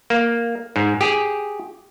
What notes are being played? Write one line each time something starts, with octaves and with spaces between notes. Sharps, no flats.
A#3
G#2
G4 G#4